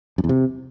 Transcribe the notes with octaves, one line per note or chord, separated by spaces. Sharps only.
F#2
E2
C3